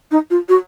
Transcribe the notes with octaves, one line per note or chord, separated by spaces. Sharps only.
D#4
F4
F#4